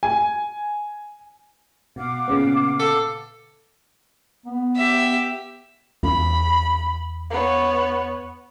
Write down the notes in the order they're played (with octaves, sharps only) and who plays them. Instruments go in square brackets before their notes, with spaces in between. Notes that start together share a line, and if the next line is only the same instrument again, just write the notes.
[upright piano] G#5
[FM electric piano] B2 [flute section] F5 F#5 D6
[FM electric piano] A#2 C#3 B3
[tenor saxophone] A4
[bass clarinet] B3
[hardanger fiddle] G4 E5
[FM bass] E2 [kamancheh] B5
[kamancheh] B3 C#5